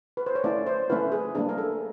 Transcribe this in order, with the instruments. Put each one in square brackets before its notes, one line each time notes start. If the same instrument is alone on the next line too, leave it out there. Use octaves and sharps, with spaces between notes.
[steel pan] B4
C5
C#5
A3 C#4 E4 D5
C5
A3 C#4 E4 B4
G#4
G3 A#3 D4 G#4
A#4
A4